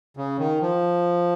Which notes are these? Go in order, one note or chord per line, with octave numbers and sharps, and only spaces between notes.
C#3
D#3
F3